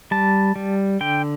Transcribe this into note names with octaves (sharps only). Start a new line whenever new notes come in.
G3 A5
G3
D3 G5